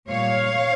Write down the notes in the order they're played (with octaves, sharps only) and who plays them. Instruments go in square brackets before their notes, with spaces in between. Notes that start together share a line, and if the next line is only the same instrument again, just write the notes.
[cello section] A#2 G3 C#5 F5